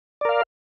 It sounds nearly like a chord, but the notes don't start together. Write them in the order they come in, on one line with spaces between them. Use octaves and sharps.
D5 A#4 F5